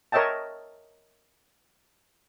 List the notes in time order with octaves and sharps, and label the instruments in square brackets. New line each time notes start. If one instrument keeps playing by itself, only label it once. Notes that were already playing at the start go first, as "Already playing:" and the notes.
[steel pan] A#4 C#5 D#5 E5 G5 A5